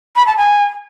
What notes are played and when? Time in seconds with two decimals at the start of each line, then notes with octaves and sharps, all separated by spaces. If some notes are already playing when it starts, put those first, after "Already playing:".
0.16 B5
0.27 A5
0.37 G#5